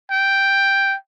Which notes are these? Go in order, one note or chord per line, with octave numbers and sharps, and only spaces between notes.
G5